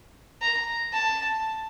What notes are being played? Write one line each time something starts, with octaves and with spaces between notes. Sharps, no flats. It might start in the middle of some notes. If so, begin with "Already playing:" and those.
A#5
A5